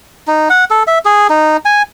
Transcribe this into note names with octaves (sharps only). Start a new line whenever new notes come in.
D#4
F#5
A4
E5
G#4
D#4
G#5